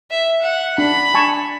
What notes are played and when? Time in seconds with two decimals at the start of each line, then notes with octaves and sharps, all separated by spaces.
0.11 E5
0.42 F#5
0.78 D4 B5
1.14 G#5 A5 C#6